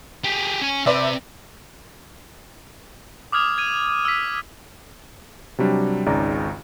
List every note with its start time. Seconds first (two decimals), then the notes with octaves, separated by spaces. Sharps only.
0.24 G4 G#4
0.62 C#4 G#5
0.86 C3 C4 B4 D5 E5
3.32 D6 D#6 F6 G#6 F7
3.58 G#6 D#7
4.05 E6 B6
5.58 C3 F#3 G3 D4
6.06 G#1 C#2 C#3 D#4 D5 A#5